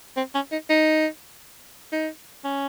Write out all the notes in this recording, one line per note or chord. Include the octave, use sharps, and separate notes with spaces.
C4
C#4
D#4
D#4
D#4
C#4